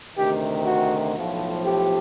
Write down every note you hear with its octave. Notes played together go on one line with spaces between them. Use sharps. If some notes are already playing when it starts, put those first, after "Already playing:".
D2 C3 D#3 G4
F#4
B1 A2 F3
G4